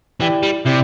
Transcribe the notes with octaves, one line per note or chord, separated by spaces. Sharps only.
E3 E4 G4 D5 G5
G3
C3 E4 G4 D5 G5